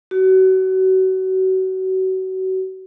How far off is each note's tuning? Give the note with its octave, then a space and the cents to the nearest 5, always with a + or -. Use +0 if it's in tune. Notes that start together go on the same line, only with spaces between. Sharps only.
F#4 +30